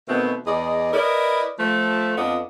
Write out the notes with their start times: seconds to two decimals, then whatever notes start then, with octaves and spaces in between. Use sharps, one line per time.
0.08 B2 D#3 A3 B3 C4
0.46 E2 G#4 D5 D#5
0.93 E4 A#4 B4 D5 D#5
1.59 F3 A3
2.17 F2 B3 D4 F4 D#5